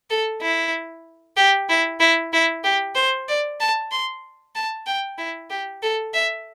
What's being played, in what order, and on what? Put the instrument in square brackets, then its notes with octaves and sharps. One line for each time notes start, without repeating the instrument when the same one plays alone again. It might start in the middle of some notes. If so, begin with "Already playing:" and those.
[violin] A4
E4
G4
E4
E4
E4
G4
C5
D5
A5
C6
A5
G5
E4
G4
A4
E5